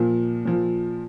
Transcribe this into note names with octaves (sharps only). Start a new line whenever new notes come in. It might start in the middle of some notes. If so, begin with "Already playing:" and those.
Already playing: A#2 F3
A#2 F3